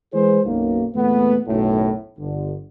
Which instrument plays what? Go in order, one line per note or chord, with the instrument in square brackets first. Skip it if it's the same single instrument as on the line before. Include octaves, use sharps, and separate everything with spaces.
[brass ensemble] E3 G#3 E4 G#4 B4 C5
B1 F#2 A#3
E2 A#2 A3 B3
B1 F#2 A2
G1 D3